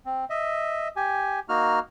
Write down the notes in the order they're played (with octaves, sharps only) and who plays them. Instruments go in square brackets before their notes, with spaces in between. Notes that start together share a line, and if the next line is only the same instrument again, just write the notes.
[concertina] C4
D#5 E5
G4 G#5
A#3 D#4 F#4 F6